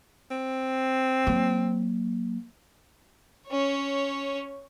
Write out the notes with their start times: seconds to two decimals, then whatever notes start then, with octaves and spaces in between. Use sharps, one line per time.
0.31 C4
1.27 F#3 A#3
3.48 C#4 C#5